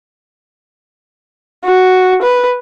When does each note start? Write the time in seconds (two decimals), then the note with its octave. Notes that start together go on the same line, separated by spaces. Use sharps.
1.64 F#4
2.22 B4